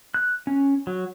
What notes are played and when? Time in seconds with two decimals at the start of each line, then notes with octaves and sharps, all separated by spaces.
0.14 F#6
0.47 C#4
0.87 F#3